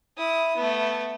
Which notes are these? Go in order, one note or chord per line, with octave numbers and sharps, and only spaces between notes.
E4 D#6
A3 B3